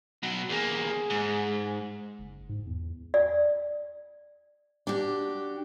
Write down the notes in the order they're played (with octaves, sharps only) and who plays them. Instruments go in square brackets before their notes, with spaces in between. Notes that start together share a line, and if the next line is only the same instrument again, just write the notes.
[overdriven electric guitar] B2 F#3
[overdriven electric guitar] E2 A#3 [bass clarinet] G#4
[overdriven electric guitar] G#2
[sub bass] F#1
G#2
E2
[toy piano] D5
[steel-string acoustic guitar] D4 F#4 G4